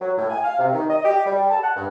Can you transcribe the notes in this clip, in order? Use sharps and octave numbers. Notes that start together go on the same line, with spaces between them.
F#3
A2
G#5
F5
C3
D#3
D#5
G4
G3
A5
F#5
G2